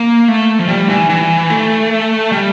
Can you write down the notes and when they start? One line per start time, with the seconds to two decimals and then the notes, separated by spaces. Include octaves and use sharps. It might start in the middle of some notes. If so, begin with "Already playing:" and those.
Already playing: A#3
0.28 A3
0.59 F3
0.68 G3
0.89 E3
1.09 E3
1.50 A3
2.32 G3